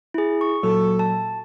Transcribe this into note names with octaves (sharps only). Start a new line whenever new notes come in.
E4 G#4
C#6
A#2 F#3 A4
A5